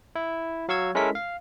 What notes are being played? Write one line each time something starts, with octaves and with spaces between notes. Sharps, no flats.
E4
F#3 F5 C#6 E6 G#6
G#3 C#4 E4 A4 A#4 B6
F5